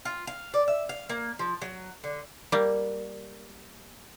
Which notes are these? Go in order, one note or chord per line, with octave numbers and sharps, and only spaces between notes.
F4
F5
D5
E5
F5
A#3
F3
F#3
D3
G3 A#3